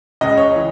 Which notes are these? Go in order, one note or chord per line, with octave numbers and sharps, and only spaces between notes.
C#2 C#3 G#3 D#5
C#5
E3